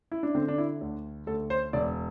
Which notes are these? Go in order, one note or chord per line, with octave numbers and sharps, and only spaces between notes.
E4
D4
D3 C4
D4
E4
D2
D2 A4
C5
E1 D5